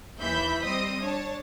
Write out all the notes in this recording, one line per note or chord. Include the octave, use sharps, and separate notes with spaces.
D#2 E3 E5 B5 G6 B6
G3 C4 C5 D#5 D#6
D4 C#5 A5